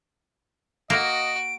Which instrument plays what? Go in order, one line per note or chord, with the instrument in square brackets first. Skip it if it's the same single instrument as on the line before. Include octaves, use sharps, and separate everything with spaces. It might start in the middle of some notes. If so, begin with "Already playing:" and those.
[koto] A#3 [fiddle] F#4 [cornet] D#5 [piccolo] D7